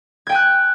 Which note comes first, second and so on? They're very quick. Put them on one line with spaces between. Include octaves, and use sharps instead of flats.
G#6 G5 G#5 F#6